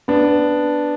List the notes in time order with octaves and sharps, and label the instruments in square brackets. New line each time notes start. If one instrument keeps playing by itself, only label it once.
[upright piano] B3 D4